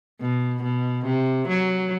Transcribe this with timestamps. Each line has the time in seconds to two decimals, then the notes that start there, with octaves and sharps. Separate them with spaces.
0.21 B2
0.63 B2
1.06 C3
1.48 F#3